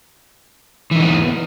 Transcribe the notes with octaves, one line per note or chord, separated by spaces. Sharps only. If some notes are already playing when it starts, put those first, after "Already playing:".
E3 B3 D#4